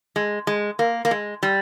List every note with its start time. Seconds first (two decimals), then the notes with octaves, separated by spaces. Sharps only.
0.16 G#3
0.47 G#3
0.79 A#3
1.05 A#3
1.11 G#3
1.43 G3